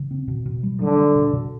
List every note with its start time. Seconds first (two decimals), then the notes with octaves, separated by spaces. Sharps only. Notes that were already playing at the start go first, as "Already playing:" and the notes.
Already playing: C#3
0.11 C4
0.28 B2
0.46 B2
0.63 G3
0.81 D3 G3
0.98 G3
1.15 B2
1.33 B2